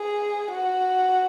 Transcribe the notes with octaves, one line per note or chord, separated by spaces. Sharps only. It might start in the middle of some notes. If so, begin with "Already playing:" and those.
Already playing: G#4
F#4